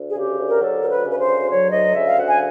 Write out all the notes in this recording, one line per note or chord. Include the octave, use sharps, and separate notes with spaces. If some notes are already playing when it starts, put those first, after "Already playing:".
Already playing: D2
G#4
C#3 G4
D2
A#4
F#3 A4
D2 A#4
B4
C#3
B4
C5
D2
F#3 C#5
D2 D#5
C#3 E5
F5
D2 F#5
G#5